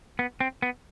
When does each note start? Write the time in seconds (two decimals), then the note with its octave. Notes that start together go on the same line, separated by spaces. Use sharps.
0.19 B3
0.40 C4
0.62 B3